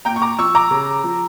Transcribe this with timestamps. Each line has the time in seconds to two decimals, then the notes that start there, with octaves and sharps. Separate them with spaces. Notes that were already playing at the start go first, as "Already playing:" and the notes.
0.05 A#2 G5 A#5
0.16 C#6
0.22 A#5 D6
0.39 F3 C#6 E6
0.55 A#5 D6
0.71 C#3
1.04 F3